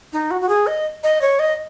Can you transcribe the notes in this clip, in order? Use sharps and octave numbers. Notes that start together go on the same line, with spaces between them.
D#4
F#4
F#4
G#4
D#5
D#5
C#5
D#5